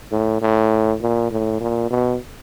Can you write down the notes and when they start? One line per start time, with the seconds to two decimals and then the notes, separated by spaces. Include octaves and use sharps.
0.11 A2
0.41 A2
1.01 A#2
1.31 A2
1.60 A#2
1.90 B2